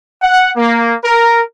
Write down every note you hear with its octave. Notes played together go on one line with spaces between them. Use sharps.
F#5
A#3
A#4